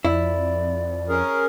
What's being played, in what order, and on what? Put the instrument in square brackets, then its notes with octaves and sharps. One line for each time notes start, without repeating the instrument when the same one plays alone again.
[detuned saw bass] F2 [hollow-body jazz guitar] E4 [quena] D5
[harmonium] C#4 G#4 A#4